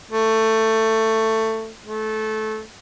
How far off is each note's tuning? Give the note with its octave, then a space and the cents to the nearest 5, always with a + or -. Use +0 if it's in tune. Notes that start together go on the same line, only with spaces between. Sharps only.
A3 +15
A3 -20